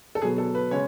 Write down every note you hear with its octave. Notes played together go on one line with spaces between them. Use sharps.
A4
B2 F#3 B3 G#4
A4
B4
C#3 G#3 C#4 C#5